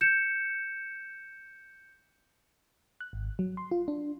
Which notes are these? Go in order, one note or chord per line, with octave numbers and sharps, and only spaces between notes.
G6 C#7 E7
F#6
G#1
F#3
C6
F4
D4